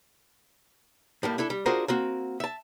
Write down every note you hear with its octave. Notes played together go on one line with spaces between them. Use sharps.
A2 G3 A#3
D4 E4 A4
G3
D4 F4 F#4 G#4 A#4 C5
A#3 C4 F#4
E5 A5